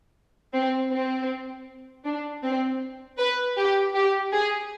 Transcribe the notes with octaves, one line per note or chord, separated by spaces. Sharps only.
C4
C4
D4
C4
B4
G4
G4
G#4